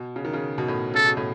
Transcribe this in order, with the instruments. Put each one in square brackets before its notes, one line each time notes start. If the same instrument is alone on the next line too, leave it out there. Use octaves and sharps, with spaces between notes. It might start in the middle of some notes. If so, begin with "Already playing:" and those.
Already playing: [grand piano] B2
C#3
D#3
C#3
B2
A2
[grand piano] C#3 [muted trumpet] A4
[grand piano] B2
A2